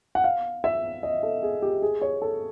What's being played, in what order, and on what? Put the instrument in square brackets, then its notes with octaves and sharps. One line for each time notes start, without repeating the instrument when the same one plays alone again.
[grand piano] F#5
F5
E5
D#5
A4
G#4
G4
G#4
C#5
A4